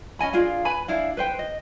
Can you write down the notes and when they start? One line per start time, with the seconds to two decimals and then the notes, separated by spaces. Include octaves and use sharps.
0.19 C#4 D#5 G#5 B5
0.33 D4 F4 G#4 F5
0.65 B4 G#5 B5
0.88 D4 E4 F5
1.17 B4 C5 G5
1.39 D#5